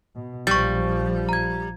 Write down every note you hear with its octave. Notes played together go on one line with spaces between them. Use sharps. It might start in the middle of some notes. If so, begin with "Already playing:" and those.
B2
A#1 F3 G3 C#6 A6
A#5 G#6